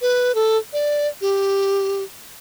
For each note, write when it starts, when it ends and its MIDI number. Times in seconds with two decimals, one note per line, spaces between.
0.01 0.35 71
0.35 0.58 69
0.73 1.08 74
1.21 2.03 67